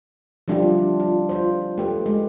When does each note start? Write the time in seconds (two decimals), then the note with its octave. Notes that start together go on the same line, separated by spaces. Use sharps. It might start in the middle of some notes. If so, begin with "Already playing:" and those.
0.48 F3 G3 D4 E4 F4 G4
1.00 F4
1.29 F4 C5
1.78 A3 G4 B4
2.06 G#3